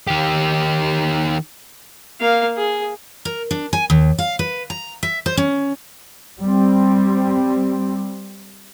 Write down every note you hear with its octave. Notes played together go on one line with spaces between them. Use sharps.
D#3 G4
A#3 F5
G#4
A#4
D4
G#5
D#2
F5
B4
A#5
E5
C5
C#4
G3 C4